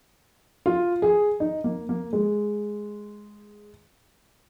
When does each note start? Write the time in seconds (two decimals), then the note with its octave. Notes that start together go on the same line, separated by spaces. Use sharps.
0.66 F4
1.02 G#4
1.40 D#4
1.64 A#3
1.89 A#3
2.13 G#3